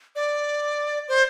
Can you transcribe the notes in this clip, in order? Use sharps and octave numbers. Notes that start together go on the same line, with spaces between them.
D5
C5